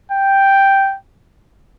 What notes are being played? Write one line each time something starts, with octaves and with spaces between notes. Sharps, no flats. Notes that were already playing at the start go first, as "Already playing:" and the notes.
G5